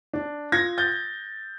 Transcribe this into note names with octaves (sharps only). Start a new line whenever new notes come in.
D4
F4 G#6 A#6
G6 A6